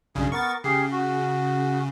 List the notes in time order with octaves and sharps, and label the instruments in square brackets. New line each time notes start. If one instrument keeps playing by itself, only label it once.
[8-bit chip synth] B1 G2 C#3 [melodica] G#4
[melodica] B3 A#4 [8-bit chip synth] C#6 A6
[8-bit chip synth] C#3 [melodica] G4 G#4 F5
[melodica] F#4